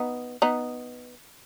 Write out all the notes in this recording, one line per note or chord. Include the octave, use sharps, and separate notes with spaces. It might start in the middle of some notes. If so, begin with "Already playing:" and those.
Already playing: B3 D#4
B3 D#4